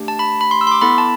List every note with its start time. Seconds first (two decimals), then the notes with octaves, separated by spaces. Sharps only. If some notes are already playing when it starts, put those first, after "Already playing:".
Already playing: A3 D4 G4
0.08 A5
0.19 B5
0.41 B5
0.51 C6
0.61 E6
0.67 C6
0.72 D6
0.81 B3 E4 A4 B5
0.98 A5